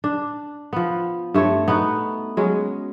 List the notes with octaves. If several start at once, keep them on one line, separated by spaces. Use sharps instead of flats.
D4
F3 B3
G2 A3 C4 C#5
B3 D#4 F#4
F#3 G#3 C#4